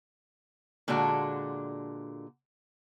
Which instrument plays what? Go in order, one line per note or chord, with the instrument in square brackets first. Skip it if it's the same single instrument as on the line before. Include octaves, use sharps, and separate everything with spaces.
[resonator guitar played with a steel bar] A#2 D3 G#3 D4 F#4